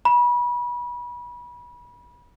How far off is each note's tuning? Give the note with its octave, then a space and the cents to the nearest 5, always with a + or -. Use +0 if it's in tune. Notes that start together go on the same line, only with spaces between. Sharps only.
B5 -30